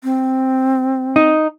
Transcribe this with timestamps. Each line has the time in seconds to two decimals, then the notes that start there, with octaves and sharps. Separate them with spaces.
0.04 C4
1.16 D#4